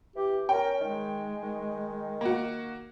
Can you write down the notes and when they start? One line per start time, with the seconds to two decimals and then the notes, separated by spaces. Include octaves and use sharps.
0.16 E3 G4
0.49 C#4 A#4 G5
0.81 D#3 G#3
1.43 D#3
2.21 A#3 F#4